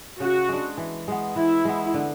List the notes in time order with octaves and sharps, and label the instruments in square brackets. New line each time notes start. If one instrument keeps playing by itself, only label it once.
[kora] C#3 [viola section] F#4
[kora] G#3 D4
E3
G#3 B3
[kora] E3 [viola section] E4
[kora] G#3 B3
D3